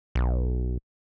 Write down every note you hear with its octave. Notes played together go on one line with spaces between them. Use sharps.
B1